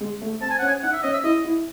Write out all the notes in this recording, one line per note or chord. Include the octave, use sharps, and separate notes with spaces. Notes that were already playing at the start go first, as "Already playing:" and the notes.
G#3
A3
C4 A5
G#5
C#4 F#5
G#5
D#4 F#5
E5
C#4 D#5
E5
E4 D#5
E4